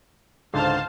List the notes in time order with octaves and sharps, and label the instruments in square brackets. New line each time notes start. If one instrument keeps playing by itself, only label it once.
[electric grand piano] C#2 G#2 D3 [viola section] C5 F5 A5